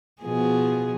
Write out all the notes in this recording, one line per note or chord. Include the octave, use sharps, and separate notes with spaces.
B2 F3 G#4